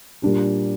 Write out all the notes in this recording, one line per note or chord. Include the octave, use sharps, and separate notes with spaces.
A#2 G3 D4 G4